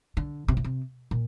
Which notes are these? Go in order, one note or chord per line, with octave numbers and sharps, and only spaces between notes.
D3
C3
A#2
C3
A#2